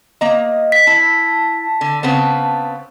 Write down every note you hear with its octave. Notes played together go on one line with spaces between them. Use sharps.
A#3 D#5 A#5
B6
E4 A5
D3
C#3 B3 C4